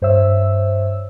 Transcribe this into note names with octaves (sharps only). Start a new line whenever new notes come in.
G2 C5 C#5 E5 E6